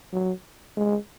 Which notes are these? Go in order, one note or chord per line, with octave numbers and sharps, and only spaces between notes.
F#3
G#3